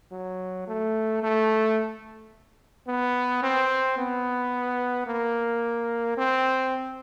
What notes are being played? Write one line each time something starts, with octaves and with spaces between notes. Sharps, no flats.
F#3
A3
A3
B3
C4
B3
A#3
C4